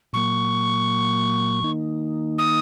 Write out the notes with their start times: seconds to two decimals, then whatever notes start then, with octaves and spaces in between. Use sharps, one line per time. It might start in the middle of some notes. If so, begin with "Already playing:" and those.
0.13 A#2 F#3 A#3 C#6
1.63 D#3 A#3 D#4
2.38 D#6